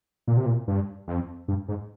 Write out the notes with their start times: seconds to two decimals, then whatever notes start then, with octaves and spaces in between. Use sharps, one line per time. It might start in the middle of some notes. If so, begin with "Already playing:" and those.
0.27 A#2
0.37 C3
0.46 A#2
0.68 G2
1.08 F2
1.48 G2
1.68 G#2